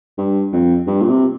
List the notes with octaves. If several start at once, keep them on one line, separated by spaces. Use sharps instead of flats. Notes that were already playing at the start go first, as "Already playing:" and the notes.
G2
F2
G2
A#2
C3